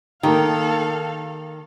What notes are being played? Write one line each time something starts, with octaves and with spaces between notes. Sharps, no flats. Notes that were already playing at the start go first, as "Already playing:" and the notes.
D#3 A#3 D#4 G4 A4 F5